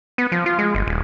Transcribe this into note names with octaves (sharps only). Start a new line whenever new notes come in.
B3
F3
F4
G#3
G1
D#1